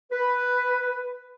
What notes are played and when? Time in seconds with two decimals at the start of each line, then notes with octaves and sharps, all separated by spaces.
0.11 B4